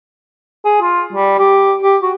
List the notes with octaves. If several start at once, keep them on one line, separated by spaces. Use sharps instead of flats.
G#4
F4
G3
G4
G4
F#4